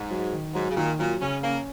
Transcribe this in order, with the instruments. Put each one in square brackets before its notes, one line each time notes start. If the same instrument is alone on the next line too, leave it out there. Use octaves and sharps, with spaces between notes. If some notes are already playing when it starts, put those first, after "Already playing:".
Already playing: [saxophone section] G#2
[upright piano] F#3
D#3
[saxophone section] G#2 [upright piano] F#3
[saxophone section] C#3
[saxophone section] A#2 [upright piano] D#3
[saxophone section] A#2 [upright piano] F#3
[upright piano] C#3 [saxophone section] C#4
[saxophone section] A#3 [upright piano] C#4